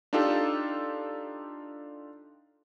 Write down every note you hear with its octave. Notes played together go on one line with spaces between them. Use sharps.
D4 D#4 F4 G4 A4